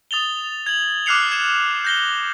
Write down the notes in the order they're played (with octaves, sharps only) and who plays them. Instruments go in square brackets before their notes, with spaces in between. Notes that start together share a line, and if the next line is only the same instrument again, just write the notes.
[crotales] D#6 A6 F7 G7
G#6 F#7
D6 F6 F#6 C7 C#7 F7
G#6 E7
G6 A#6 G7